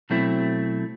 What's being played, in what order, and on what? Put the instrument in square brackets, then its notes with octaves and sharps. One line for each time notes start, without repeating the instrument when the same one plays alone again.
[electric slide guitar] B2 F#3 A3 C4 E4